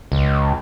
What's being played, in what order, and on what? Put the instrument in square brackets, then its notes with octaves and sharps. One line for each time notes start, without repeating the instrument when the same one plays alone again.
[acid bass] C#2